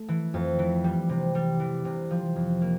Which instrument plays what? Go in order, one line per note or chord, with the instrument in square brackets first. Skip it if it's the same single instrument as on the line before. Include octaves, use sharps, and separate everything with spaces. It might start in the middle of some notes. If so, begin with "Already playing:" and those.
Already playing: [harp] A3
E3
F2
E3
G3
C3
G3
E3
C3
F3
F2
A#3